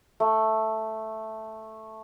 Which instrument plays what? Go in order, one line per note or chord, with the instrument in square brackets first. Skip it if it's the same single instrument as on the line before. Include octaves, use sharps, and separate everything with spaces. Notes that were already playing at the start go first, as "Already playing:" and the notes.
[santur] A3